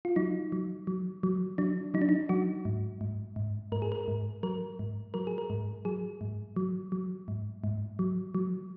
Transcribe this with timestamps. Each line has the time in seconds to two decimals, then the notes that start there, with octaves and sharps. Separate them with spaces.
0.05 F4
0.16 F#3 D#4
0.52 F#3
0.87 F#3
1.23 F#3
1.58 F#3 D4
1.94 F#3 D#4
2.02 D4
2.09 D#4
2.29 F#3 F#4
2.65 G#2
3.01 G#2
3.36 G#2
3.72 G#2 A#4
3.82 G#4
3.92 A#4
4.08 G#2
4.43 F#3 A#4
4.79 G#2
5.14 F#3 A#4
5.27 G#4
5.38 A#4
5.50 G#2
5.85 F#3 G#4
6.21 G#2
6.56 F#3
6.92 F#3
7.28 G#2
7.64 G#2
7.99 F#3
8.35 F#3